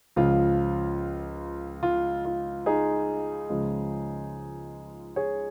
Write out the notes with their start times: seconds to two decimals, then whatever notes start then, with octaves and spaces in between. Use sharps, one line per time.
0.16 C#2 C#3 F3 F4
1.83 F4
2.25 F4
2.66 D#4 G#4
3.49 C#2 C#3 F3 G#3
5.16 G#4 C#5